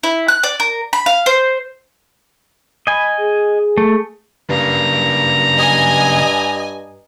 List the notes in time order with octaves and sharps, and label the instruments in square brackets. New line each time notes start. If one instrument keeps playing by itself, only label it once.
[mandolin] E4
F#6
D5
A#4
B5
F5
C5
[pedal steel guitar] D#5 G#5 [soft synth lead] B5
[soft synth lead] G#4
[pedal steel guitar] A3
[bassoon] G2 [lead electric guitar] C#3 A#3 [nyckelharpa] A#5
[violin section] D#5 G#5